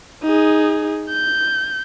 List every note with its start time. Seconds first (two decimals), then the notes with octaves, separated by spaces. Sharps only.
0.23 D#4 G#4
1.10 G6